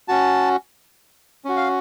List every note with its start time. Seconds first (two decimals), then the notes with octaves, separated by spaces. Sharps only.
0.08 C#4 F#4 A5
1.45 C#4 F#4
1.57 F5